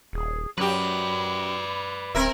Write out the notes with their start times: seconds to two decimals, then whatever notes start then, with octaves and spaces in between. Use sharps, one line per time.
0.13 D#1 G#4
0.58 F#2 F#3 G4 B4 D5 B5
2.15 D1 C4 A#4 E5